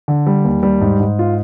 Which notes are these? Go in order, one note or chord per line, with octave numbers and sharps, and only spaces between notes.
D3
G3
D#2
G3
G#2
G#2
F4